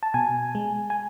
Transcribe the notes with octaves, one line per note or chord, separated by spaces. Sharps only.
A5
B2 G#5
G#3
G#5